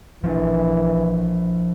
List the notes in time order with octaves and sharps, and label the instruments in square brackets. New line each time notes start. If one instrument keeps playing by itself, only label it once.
[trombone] E3 [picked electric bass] F3 C#4 D4